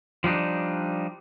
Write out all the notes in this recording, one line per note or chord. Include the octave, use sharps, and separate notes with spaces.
F3 G3 D4 D#4